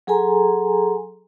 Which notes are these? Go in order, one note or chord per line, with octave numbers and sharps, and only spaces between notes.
F#3 G#4 A4 G#5 A#5 C6